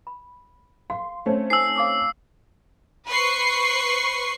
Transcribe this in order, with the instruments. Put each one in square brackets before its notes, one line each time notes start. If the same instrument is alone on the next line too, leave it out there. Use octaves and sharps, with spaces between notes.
[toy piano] B5
[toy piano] F5 [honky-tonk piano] C6
[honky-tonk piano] A3 C4 C#4
[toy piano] D#4 A4 G#5 [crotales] E6 C7
[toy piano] F5 D6 D#6
[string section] B4 C5 C#6 C7